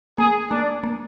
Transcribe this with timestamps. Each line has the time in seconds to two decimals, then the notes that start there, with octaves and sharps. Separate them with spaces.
0.18 A#3 G#4
0.51 A#3 D4
0.84 A#3